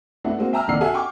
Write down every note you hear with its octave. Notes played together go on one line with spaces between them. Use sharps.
A3 B3 D4 E4 F#5
G#3 A#3 C4 F#4
E5 G5 A5 A#5 E6 F6
F1 A#1 D#2 D5 F#5 C7
F#4 G4 A4 E5 F#5 G#5
G5 C#6 D6